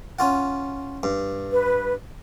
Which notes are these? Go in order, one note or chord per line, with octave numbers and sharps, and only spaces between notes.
C#4 F4 F#5
G2
B4